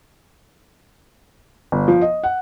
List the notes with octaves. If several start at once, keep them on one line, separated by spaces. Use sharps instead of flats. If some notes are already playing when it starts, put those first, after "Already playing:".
G1
F3
D#5
F#5